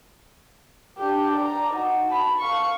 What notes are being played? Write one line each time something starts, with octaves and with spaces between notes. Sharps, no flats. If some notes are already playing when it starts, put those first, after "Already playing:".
D4 G4
D5 A#5
D#4 F#4
A5 B5
F5 C#6